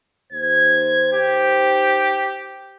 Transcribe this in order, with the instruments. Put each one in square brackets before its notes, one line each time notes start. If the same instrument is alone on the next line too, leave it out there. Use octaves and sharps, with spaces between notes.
[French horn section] D#2 C5 [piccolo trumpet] G#6
[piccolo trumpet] G4